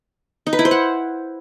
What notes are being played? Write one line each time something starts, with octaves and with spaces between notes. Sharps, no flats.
D#4
B4
E4
C5
F#5